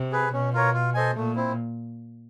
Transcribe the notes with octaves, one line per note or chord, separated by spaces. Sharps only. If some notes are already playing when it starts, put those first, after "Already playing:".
Already playing: C3
G#4 B4
B2 C#4
F4 A#4 C#5
F4
A4 C5 D#5 G#5
A#2 A3
C4 E4